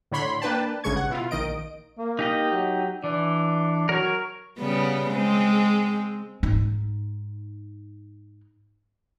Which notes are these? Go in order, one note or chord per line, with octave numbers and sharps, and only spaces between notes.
A2 D3 C#5 B5 C6
A#3 D4 B4 G5 A5
A1 G2 C#3 G#3 C#6 G#6
F#5
B2 E4 F4
A#1 D#3 D#5 D7
A#3
D#4 G4 D#5
F#3
E3 D4
F#3 A#4 C#5
C#3 G3 B3
G#3 C4
G#2 D#4